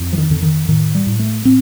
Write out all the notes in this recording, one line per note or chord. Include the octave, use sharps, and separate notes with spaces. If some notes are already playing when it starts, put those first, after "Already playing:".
Already playing: F2
F3
D#3
F2 D3
D#3
A2 D#3
G3
A2
A3
A2 C4